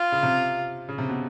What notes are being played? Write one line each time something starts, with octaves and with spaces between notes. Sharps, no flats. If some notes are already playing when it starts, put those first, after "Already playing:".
Already playing: F4
C#3
C3
C#3
C3
B2